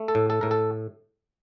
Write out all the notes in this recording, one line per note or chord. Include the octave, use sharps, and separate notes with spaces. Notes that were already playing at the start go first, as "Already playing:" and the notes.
Already playing: A3
A4
A2
A4
A2 A#4
A4